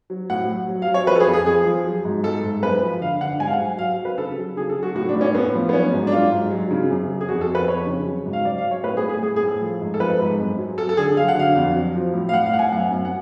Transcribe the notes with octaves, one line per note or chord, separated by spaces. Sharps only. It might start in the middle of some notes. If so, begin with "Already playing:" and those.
F#3
A2 F#5
F#3
F#3
F5
F#3
C#5
F3 B4
A4
G#4
F2
G#4
F3 G#4
F3
F#3
G#2
G#2 A4
G#2
F#2 B4
F3
D3 F5
D3 F#5
G#2 G#5
F5
F#5
F#3
F#3 F5
F#3
B4
C#3 A4
F#3
C#3 G#4
A4
F#3
F#4
A2 F#4
D4
A2
C#4
A2 B3
F3
B3
F#3 C#4
G#2
D4
F#3 F4
G#2
F#3
C#3
F#2
F#3
G#4
F2 F#4
A4
F2
B4
F2 C#5
C#3
F#3
G#2
F5
F#3 D5
F5
F#3
C#5
A2 B4
G#4
A2
G#4
A2 G#4
G#4
A2
A4
F3
G#2
A4
F3 B4
G#2
F#2
F#3
F#3 A4
A4
D3 G#4
F#3 F5
F#5
D3 F5
F2
F#3
F3
A2
F5
A2 F#5
F5
A2 F#5
G#5
F#2 F#5
F#2
F#5